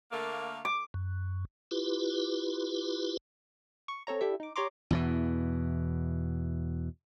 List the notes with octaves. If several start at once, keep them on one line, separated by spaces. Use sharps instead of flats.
D3 A3 A#3
D6
F#2
E4 F4 G4 B4
C#6
C4 A4 C#5 A#5
D4 E4 G4 A4 E5
D#4 D6
G4 C#5 D5 A#5 C6 D6
E2 B2 E3